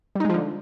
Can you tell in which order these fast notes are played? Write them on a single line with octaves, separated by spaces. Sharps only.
G3 D#4 G#3 F3 D3